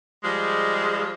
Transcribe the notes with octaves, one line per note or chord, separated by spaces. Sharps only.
F3 G3 G#3